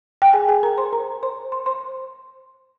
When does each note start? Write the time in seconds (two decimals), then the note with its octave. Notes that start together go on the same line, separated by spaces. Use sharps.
0.22 G5
0.33 G#4 G#5
0.48 G#4 G#5
0.63 A#4 A#5
0.78 C5 C6
0.93 A#4 A#5
1.23 C5 C6
1.52 C6
1.66 C5 C6